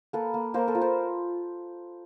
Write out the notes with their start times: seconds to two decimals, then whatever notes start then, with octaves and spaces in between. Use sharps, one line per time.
0.13 A#3 A4 B4
0.34 A#3
0.54 A#3 A#4 C5
0.68 A4 B4
0.75 F4
0.81 A#4 C5